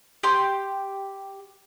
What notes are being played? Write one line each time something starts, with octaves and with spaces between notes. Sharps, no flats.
G4 C6